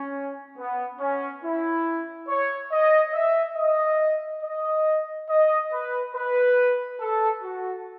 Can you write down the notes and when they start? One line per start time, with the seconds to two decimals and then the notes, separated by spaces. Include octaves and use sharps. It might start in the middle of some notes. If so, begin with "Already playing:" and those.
Already playing: C#4
0.57 B3
0.99 C#4
1.43 E4
2.28 C#5
2.72 D#5
3.14 E5
3.57 D#5
4.43 D#5
5.29 D#5
5.72 B4
6.14 B4
7.00 A4
7.42 F#4